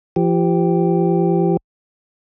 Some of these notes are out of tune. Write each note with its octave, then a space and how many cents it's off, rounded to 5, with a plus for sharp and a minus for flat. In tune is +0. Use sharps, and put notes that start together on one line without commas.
F3 -35 G4 +0